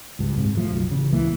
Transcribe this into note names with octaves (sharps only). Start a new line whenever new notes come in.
C#2 G2
D#1 G#2 C3
E1 F3 A3
F#1 B1
A1 C#3
D1 C#2 E3 A#3